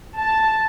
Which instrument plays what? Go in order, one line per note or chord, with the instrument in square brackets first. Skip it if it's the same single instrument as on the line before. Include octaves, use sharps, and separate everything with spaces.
[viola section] A5